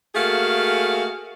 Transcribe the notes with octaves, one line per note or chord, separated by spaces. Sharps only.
A3 A#3 F#4 G#4 F5